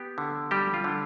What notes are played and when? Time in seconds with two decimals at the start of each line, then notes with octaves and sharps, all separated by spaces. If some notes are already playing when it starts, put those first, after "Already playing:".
Already playing: B3 G4
0.18 D3
0.51 G3 G4
0.74 F4
0.84 D3